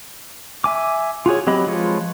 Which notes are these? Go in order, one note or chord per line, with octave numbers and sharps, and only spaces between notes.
E5 G#5 D6
F4 F#4 G#4 C#5
F#3 C4 G4 D#5 B5
F3 G#3 F4 B4 C#5